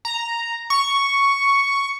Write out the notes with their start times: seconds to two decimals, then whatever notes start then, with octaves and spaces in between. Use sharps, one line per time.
0.05 A#5
0.70 C#6